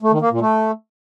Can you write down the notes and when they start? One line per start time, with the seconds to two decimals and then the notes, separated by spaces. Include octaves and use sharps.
0.02 A3
0.12 D#3
0.22 A#3
0.31 A#2
0.41 A3